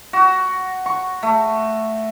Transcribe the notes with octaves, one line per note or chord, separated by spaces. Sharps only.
F#4
C#6
A3